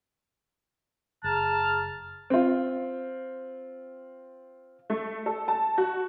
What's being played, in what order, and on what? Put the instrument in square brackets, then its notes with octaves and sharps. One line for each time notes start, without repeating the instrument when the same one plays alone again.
[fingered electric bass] F#1 [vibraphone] G#4 A#5 [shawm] A5 [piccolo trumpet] F6
[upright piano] C4 F4
[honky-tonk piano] A3
A4
A5
F#4